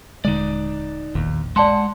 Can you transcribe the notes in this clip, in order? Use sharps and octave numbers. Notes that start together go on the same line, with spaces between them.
D#1 D3 G#3 D#4 D5
E1 A#1 D#2
G#3 D5 F#5 A5 C6